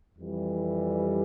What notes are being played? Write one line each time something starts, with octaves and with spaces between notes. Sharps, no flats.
F2 E3 G3